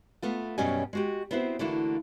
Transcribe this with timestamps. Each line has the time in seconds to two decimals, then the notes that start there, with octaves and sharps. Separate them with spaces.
0.22 A3 B3 F4
0.58 F#2 B2 G3 C#4 D#5 G#5
0.93 G#3 F#4 G4
1.31 B3 C4 E4 F#4 C5
1.59 D3 E3 A3 A#3 E4 F#4